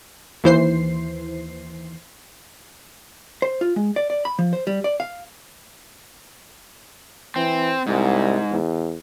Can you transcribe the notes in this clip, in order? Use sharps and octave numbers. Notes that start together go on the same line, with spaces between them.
D#2 E3 C5 C7
C5
F4
G#3
D5
D5
B5
F3
C5
G3
D5
F5
E3 C4
C2 G#2
E2